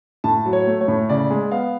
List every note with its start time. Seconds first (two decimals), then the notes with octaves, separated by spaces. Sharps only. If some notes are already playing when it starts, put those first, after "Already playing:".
0.24 A2 A5
0.46 F#3
0.53 C#5
0.67 A3
0.81 C#5
0.88 A2
1.09 C#3 D5
1.30 G#3
1.51 B3 F5